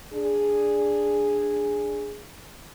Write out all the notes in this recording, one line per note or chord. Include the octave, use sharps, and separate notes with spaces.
D4 G#4